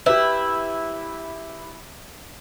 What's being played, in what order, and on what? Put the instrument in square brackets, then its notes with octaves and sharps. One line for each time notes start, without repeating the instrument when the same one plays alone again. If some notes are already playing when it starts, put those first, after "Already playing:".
[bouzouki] E4 [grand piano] G4 B4